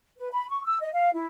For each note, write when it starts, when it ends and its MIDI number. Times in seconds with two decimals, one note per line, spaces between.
0.18 0.29 71
0.32 0.49 83
0.49 0.64 85
0.64 0.77 88
0.82 0.92 75
0.94 1.10 77
1.14 1.26 64